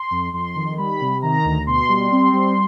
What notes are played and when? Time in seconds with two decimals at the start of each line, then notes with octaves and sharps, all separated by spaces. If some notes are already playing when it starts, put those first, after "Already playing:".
Already playing: C6
0.11 F2
0.33 F2 C6
0.56 D#3
0.78 G3 B5
1.01 C3
1.22 D#3 A#5
1.45 D2
1.67 B2 C6
1.89 G3
2.12 C4
2.33 G3